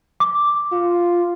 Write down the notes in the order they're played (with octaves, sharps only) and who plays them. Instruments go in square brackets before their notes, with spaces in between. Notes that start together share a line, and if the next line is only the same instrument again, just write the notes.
[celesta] D6
[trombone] F4